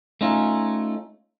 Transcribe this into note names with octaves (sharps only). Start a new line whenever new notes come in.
A3 C#4 D#4 F4